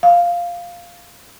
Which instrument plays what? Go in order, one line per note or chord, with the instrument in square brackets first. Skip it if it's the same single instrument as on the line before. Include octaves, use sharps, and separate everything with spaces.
[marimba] F5